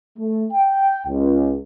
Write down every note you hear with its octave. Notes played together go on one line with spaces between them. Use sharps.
A3
G5
C#2